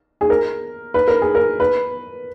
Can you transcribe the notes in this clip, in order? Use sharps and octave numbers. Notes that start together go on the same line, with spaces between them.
G#4
A#4
B4
A#4
G#4
A#4
B4